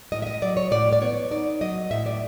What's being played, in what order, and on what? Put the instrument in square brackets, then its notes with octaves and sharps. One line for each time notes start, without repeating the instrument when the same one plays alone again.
[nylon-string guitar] A2 D#5
E5
D#5
F#3 D5
C#5
A2 D5
D5
B3 C#5
D#4 D5
F#3 D#5
A2 E5
D5